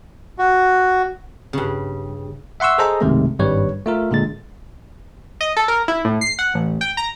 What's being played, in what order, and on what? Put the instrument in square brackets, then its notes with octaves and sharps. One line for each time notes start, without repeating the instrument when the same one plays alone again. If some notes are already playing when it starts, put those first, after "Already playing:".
[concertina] F#4
[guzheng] G2 C#3
[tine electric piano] E5 F#5 C6 C#6 E6
G#4 A4 C5 D#5 A#5
B1 F#2 C3 D#3 G#3 A3
G#1 G2 G3 B4 C#5
A3 F4 A#4
A#2 D3 G#3 A6
[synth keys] D#5
A4
A#4
E4
A2
C7
F#5
A1
G5
A#5